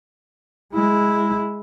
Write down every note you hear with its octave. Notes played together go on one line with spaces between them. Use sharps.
G#3 E4